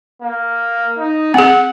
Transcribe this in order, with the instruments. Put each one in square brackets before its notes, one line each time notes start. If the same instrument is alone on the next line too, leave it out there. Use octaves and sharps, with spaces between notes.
[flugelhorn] A#3
D#4
[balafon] C4 G#4 [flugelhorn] F#5